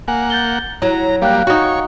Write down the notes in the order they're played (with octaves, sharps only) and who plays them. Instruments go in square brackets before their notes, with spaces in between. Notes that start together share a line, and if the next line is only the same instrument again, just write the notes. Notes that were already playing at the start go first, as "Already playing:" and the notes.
[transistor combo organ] A#3 F#5 [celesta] G#5
[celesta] G6 A6 G7
[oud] F#3 [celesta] E4 [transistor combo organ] A#5
[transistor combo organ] G3 A#3 [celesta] F5 G5 F#6
[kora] D#4 F#4 [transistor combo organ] C#5